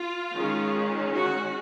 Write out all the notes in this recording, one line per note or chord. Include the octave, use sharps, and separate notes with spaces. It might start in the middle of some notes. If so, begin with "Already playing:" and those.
Already playing: F4
D#3 G#3 C#4
F#4